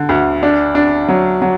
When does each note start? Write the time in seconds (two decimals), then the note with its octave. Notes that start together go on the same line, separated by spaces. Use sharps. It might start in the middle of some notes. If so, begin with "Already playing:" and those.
Already playing: D3
0.09 D2
0.43 D4
0.75 D4
1.08 F#3
1.42 F#3